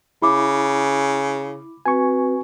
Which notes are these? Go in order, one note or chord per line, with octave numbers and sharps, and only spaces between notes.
C#3 E4 B5 D6
C4 F#4 B4 G#5 C#6